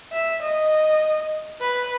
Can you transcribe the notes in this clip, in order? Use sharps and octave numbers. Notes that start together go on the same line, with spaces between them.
E5
D#5
B4